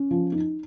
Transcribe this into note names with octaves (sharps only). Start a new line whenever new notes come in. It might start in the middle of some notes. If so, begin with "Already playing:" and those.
Already playing: C#4
F3
D#4